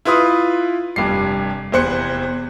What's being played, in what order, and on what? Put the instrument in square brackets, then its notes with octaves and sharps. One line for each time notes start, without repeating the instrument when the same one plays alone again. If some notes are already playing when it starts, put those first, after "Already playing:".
[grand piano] E4 F4 B4 C6 D#6
F1 G2 G3 C7
F1 E2 C5 F#6 C#7